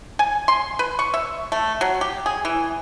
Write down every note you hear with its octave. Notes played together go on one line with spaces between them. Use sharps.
G#5
C6
B4
C#6
E5
A3
F#3
G4
G#4
E3